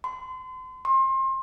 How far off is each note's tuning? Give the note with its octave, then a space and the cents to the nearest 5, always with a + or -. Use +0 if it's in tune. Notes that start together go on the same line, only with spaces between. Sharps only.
C6 -35
C6 +30